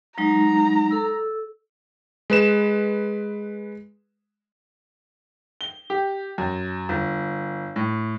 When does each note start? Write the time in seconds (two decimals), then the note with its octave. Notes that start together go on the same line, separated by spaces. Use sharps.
0.18 F#3 G#3 D#4 A#5
0.91 A4 E6
2.30 G#3 B4 E7
5.61 G7
5.90 G4
6.38 F#2
6.89 G1
7.76 A2